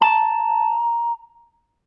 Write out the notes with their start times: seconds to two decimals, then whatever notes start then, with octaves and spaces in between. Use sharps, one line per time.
0.01 A5 A#5